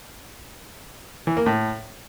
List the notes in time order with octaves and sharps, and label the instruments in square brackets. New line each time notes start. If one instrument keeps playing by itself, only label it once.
[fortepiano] E3
A#3
A2